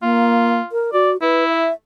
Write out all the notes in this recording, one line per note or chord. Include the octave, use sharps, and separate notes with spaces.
A#3 F4
A#4
F#4 D5
E4 B4
E5